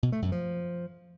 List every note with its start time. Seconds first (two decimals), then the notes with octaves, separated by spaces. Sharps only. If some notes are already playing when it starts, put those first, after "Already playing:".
0.03 B2
0.12 A3
0.22 F#2
0.32 F3